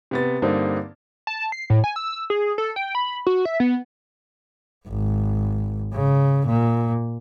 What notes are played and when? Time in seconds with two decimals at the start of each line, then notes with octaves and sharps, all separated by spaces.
0.11 C3 B3 A6
0.42 G2 D3 A#3 C4 D#4
1.27 A5
1.52 C7
1.70 A2
1.84 G#5
1.96 E6
2.30 G#4
2.58 A4
2.76 G5
2.95 B5
3.27 F#4
3.45 E5
3.60 B3
4.88 G#1
5.93 C#3
6.46 A#2